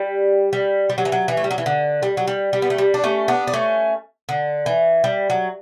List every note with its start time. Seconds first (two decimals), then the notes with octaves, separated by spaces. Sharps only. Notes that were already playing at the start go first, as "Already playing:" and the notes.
Already playing: G3
0.53 G3
0.90 G3
0.98 F#3
1.05 E3
1.12 F#3
1.28 E3
1.37 A3
1.44 G3
1.51 F#3
1.58 E3
1.66 D3
2.03 G3
2.17 F#3
2.28 G3
2.53 G3
2.62 B3
2.70 A3
2.78 G3
2.94 D4
3.04 A3 C#4
3.28 B3 D4
3.47 D4
3.54 A3 C#4
4.29 D3
4.66 E3
5.04 G3
5.30 F#3